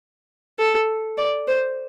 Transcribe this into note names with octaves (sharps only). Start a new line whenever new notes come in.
A4
D5
C5